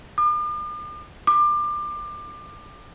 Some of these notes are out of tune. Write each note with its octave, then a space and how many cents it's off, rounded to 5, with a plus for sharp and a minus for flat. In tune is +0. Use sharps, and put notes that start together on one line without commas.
D6 +45
D6 +25